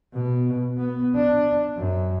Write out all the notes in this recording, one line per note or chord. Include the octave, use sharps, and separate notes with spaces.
B2
B3
D4
F#2